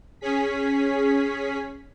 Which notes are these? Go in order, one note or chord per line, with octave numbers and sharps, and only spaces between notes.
C#4 G#4 B6